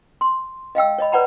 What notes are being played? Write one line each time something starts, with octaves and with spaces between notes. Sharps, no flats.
C6
D#5 F5 G5 E6
C#5 D#5 B5
B4 C#5 D5 F#5 A#5 B5